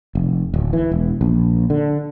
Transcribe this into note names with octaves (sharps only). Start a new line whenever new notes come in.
F1
D1
E3
E1
A#1
D3